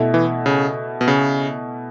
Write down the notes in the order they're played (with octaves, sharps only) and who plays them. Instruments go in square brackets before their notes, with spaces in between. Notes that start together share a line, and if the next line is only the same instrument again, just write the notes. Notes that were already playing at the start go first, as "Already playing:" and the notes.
Already playing: [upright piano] B2 A3 E4
[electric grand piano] E3
C#3
B2
C#3